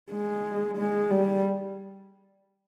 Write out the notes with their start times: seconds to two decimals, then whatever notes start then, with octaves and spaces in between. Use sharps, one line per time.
0.11 G#3
0.78 G#3
1.11 G3